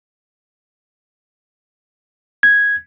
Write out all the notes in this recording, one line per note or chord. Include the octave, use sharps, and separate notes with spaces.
G#6